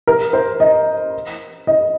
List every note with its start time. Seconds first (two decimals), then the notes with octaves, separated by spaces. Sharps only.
0.07 A#4
0.33 C5
0.60 D#5
1.67 D#5